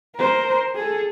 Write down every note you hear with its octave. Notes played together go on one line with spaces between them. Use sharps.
A#4 C5
G#4 A4